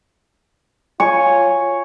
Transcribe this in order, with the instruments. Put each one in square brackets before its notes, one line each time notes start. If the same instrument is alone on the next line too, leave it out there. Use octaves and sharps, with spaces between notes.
[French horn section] F4 C#5 [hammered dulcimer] G#5 C#6